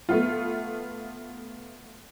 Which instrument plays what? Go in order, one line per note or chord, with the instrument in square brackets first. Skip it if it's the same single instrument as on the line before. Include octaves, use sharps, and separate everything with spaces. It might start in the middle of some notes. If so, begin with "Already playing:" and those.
[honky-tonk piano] A3 B3 F4